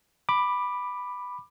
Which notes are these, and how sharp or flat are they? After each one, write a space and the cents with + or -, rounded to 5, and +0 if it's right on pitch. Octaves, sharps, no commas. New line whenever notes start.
B5 +0 D6 +15